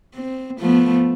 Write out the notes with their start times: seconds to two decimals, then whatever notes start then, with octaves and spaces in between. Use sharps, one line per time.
0.15 C4
0.59 F3 A3 B3